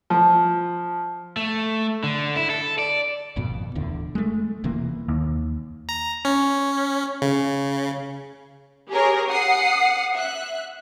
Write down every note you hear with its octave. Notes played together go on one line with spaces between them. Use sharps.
F3
A3
D3
E4
A4
D5
G#1 F2 B2
D1 E2 D3
G#3 A3
E1 C3 E3 A#3
D#2
A#5
C#4
C#3
G4 G#4 A#4 C#5
F#5 D#6 C7
E5 F#6